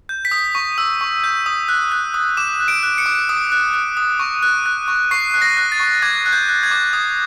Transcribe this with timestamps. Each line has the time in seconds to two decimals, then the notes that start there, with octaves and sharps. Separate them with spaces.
0.09 G6
0.25 B6
0.31 D#6
0.55 C#6
0.78 E6
1.01 C#6
1.24 G6
1.46 D#6
1.69 F#6
1.92 F#6
2.14 D#6
2.37 D6 E7
2.60 F#6
2.68 D7
2.83 F#6
2.98 C#7
3.06 D6
3.29 D#6
3.52 F#6
3.74 F#6
3.97 D#6
4.19 C#6
4.42 F#6
4.66 F#6
4.88 C#6
5.11 C#6 C7
5.34 F#6
5.42 A#6
5.57 F#6
5.72 A6
5.80 C#6
6.02 D6 G#6
6.26 F#6
6.33 G6
6.49 F#6
6.63 G#6
6.71 D6
6.93 D#6